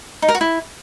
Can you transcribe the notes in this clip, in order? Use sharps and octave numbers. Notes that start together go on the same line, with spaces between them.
D#4
A#4
F#4
E4